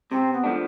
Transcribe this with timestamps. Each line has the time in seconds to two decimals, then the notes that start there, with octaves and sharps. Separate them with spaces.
0.11 C3 C4
0.33 B3
0.44 F3 A3 D4